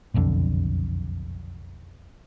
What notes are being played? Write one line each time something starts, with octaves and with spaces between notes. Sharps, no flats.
F#1 B1 F2 D3